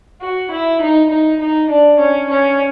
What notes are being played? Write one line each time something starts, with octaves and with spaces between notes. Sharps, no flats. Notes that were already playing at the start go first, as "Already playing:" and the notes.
F#4
E4
D#4
D#4
D#4
D4
C#4
C#4